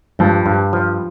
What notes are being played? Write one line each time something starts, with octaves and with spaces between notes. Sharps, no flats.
G2 F3
G2
F3